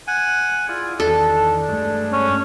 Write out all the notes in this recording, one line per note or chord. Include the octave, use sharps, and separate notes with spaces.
F#5 G#5
E4 F4 G#4 D5
E2 D#3 D4 A4
G2 G#3 A3
C#4